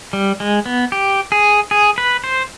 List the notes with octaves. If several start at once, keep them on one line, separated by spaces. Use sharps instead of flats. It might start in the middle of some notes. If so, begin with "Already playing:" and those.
G3
G#3
B3
G4
G#4
G#4
B4
C5